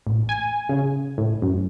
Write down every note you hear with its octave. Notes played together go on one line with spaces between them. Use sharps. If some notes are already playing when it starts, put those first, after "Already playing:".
A1
G#5
C#3
A2
F#2